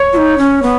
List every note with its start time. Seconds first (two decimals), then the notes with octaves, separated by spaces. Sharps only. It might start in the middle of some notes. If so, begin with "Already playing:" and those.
Already playing: C#5
0.13 F4
0.17 D#4
0.38 C#4
0.62 B3